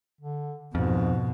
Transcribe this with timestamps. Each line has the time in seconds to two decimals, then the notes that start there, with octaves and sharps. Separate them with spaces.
0.21 D3
0.75 F2 G#2 B2